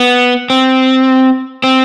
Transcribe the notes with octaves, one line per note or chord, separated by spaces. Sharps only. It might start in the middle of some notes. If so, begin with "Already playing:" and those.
Already playing: B3
C4
C4